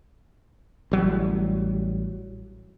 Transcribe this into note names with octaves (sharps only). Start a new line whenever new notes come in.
A1 F#3 G3